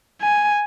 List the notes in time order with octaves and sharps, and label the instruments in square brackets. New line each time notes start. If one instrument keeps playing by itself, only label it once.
[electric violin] G#5